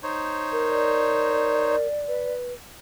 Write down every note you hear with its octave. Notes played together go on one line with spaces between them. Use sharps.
D#4 C5 C#5
A#4
D5
B4